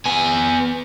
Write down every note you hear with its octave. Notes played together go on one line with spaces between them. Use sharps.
B3 G#5